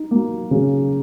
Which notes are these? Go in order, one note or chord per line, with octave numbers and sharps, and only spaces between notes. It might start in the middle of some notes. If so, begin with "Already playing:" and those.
Already playing: D#4
A#3
C#3